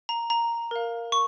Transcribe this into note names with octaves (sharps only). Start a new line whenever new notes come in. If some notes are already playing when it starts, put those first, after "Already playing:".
A#5
A#5
A#4 F5
C#6